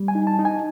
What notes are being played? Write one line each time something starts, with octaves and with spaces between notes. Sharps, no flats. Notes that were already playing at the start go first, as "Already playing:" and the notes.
Already playing: G3
G#5
D#4
A5
D#4
G#5